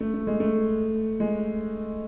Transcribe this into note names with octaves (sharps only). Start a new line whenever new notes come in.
A3
A3
G#3
A3
G#3